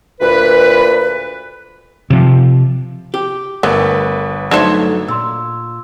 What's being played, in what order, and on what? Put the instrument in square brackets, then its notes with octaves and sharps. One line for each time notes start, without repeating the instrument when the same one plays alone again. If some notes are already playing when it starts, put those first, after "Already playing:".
[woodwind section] D2 A#2 B4
[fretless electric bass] C3 F3
[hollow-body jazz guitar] G4
[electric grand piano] G1 B4 [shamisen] A3 B3 [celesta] A#4
[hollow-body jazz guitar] F#3 A3 E5 [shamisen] D4 A4 C5 [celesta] D#4 G#6
[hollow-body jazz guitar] A#2 [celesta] C6 E6